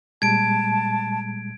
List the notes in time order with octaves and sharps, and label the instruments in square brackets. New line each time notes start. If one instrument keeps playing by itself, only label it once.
[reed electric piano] A#2 G3 G#3 [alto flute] A5 [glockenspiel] G#6 D7